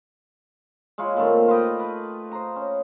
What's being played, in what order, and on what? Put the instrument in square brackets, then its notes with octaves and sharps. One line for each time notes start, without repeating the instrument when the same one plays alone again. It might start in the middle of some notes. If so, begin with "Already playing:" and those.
[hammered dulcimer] G#3 E4 F4 C#5
A#2 D#3 A3 C4
F4 B4 D#5 G5
B4
C5 A#5
C#4